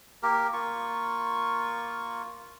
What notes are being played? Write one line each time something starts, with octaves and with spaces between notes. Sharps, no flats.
A#3 G4 A#4
A#3 F4 C#6